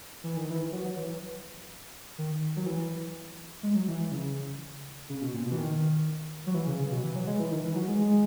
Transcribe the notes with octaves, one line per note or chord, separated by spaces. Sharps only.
E3
D#3
E3
F#3
F#3
E3
D#3
F#3
E3
G#3
F#3
E3
E3
C#3
C#3
B2
A#2
B2
E3
D#3
F#3
E3
C#3
C#3
B2
E3
F#3
G#3
E3
D#3
E3
F#3
G#3
G#3